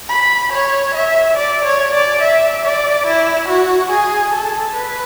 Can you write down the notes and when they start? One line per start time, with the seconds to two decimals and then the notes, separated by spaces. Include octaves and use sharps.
0.09 B5
0.53 C#5
0.94 E5
1.37 D5
1.65 C#5
1.94 D5
2.21 E5
2.64 D5
3.07 E4
3.49 F#4
3.91 G#4
4.34 A4
4.75 B4